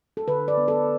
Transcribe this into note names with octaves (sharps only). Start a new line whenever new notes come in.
A4
D3 B4
D5
B3
A4